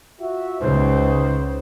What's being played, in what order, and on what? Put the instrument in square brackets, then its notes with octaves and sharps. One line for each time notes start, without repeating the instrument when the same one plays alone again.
[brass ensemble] F4 F#4 E5
[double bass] C#2 C#3 [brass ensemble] D#4 B4 C5